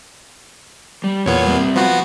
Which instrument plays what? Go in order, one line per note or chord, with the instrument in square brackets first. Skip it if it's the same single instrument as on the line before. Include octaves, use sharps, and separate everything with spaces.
[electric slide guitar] G3
[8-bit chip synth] E2 A#2 B3 [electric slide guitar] C#5
[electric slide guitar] G3 C4
[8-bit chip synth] F3 B3 F#4